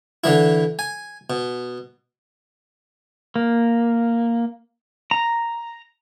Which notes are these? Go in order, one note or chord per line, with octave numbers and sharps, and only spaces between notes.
D3 E3 E4
G#5
B2
A#3
A#5